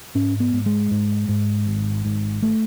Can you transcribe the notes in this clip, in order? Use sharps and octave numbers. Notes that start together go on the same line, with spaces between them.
G#2 C#4
B3
G#2
G#3
G#2
G#2
G#1
G#2
A3